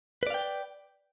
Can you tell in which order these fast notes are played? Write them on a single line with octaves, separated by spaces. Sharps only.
B4 D5 F5 G5